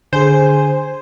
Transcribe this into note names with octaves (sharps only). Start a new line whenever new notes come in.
D3 G#4 C5 G#5